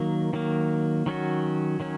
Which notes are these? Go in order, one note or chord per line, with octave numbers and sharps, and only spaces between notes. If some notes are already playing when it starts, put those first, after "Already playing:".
Already playing: D#3 F#3 A#3
D#3 F#3 A#3
D#3 F#3 C#4 F#4
D#3 F#3 C#4